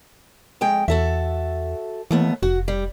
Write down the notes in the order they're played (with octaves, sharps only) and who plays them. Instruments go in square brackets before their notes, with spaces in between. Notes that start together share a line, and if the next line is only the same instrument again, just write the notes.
[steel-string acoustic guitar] F2 G#3 G5
[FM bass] E2 [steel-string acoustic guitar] F#4 A4 E5
[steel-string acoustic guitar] D#2 A3 B3 [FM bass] E3
[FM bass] F1 [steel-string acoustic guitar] F#4
[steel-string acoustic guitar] G3